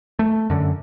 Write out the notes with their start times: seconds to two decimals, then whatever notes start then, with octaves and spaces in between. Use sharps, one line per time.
0.19 A3
0.50 F#2 D3